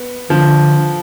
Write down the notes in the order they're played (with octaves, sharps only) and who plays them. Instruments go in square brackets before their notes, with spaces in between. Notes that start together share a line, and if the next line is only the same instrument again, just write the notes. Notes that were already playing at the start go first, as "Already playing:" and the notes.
Already playing: [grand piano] B3
[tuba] D3 [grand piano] F3